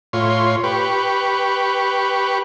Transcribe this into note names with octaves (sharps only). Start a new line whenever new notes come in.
A2 F4 C#5 C6
G4 B4 C#6